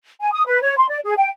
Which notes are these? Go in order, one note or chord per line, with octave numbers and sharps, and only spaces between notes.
G#5
D#6
B4
C#5
C6
D5
G#4
G5